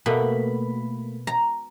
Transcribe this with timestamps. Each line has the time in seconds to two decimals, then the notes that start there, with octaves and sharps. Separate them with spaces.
0.06 B2 A3 A#3 B5
1.27 A#5